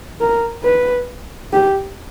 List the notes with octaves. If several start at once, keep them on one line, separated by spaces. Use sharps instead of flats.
A#4
B4
G4